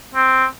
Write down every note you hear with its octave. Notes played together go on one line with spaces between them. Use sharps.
C4